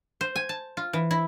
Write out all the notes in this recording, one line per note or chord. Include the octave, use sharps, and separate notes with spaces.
C5
G#5
A5
F4
E3
E4